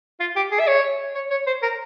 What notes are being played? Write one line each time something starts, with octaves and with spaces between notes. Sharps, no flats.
F4
G4
G#4
E5
C#5
C#5
C#5
C5
A#4